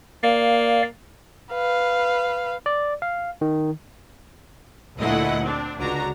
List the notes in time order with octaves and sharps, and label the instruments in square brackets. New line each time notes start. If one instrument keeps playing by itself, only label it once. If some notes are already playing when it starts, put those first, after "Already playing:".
[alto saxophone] A#3 [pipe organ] D5 F5
[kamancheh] B4 F5
[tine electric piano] D5
F5
D#3
[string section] D2 A#2 A3 E4 D#5 F#5
C4 D4
C#2 D3 D4 F#4 A#5